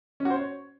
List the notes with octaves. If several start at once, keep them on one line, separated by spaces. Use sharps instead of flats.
C#4
F#4
C5
C#5